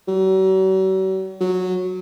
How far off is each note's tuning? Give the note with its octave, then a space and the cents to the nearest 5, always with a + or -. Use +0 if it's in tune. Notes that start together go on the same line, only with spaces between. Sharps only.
F#3 +45
F#3 -10